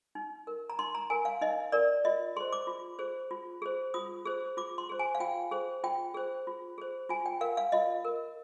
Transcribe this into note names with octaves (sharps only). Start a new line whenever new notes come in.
D#4
A#4
A#5
D#4 C6
A#5
A#4 G#5
F5
D#4 D#5
A#4 D5
F4 D#5
G#4 C5 C6
D6
F4
G#4 C5
F4
G#4 C5
F4 D#6
G#4 C5
F4 D6
C6
G#4 C5
G#5
F5
F4 G5
G#4 C5
F4 G5
G#4 C5
F4
G#4 C5
F4 G#5
G5
A#4 F5
F5
F4 D#5
A#4